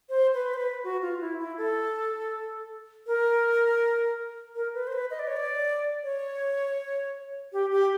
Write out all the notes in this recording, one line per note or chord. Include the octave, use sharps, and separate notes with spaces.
C5
B4
C5
B4
F#4
F4
E4
E4
A4
A#4
A#4
B4
C5
B4
D#5
D5
C#5
D5
C#5
G4
G4